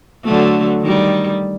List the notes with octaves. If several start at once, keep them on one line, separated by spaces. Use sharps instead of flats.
D3 F#3 A3
D#3 G3